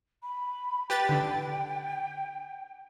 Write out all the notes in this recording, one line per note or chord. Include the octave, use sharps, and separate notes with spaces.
B5
G4 B4 G5 A6
D3 D4